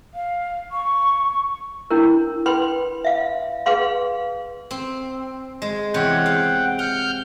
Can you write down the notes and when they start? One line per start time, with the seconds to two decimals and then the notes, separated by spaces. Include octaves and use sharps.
0.14 F5
0.72 C#6
1.91 D4 E4 A#4
2.46 B4 G5 B5 C6
3.04 E5 F5
3.66 G#4 B4 F5 C6
4.71 C4
5.62 G#3
5.94 E2 C3 C#5 F#5 G5
6.26 F5
6.79 F#5 F6 G6